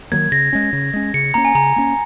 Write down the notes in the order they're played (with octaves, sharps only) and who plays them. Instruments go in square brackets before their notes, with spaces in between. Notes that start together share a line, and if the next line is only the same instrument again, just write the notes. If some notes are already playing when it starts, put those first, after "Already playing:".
[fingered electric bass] D#3 F#3 A#3 [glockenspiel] G#6
[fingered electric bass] C#3 [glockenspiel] A#6
[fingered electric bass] G#3 C#4
C#3
G#3 C#4
[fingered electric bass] C#3 [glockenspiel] C#7
[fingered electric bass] A#3 C#4 [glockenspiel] A#5
[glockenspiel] G#5
[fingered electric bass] C#3 [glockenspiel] A#5
[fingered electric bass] A#3 C#4